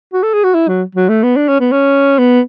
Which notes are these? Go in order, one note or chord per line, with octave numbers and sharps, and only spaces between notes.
F#4
A4
G#4
F#4
E4
F#3
F#3
A3
B3
D4
C#4
B3
C#4
B3